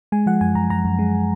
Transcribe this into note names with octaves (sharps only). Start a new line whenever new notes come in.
G#3 G#5
F3 F#5
F#2 G#5
F#2 A#5
F#2 A#5
F#2
G#3